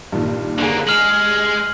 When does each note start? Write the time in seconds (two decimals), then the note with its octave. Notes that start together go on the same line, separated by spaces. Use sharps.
0.12 G2 A#2 D#3
0.58 D3 A#3 D4 G4 G#4
0.87 G#3 F6 F#7